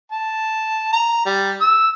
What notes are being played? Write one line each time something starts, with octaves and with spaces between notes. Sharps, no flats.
A5
A#5
G3
E6